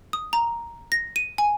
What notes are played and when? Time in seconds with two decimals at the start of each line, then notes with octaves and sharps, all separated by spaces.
0.13 D#6
0.33 A#5
0.92 A#6
1.16 D#7
1.38 G#5